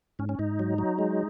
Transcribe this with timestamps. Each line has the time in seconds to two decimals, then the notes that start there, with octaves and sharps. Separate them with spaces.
0.19 G#2 C#4
0.29 C#4
0.39 G#2 D#4
0.59 F#3
0.78 F#3
0.99 G#3